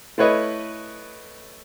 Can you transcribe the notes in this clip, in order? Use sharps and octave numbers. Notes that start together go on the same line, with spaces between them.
A3 E4 B4 C#5 D#5